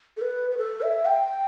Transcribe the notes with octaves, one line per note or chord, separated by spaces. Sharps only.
A4
B4
B4
A4
E5
G5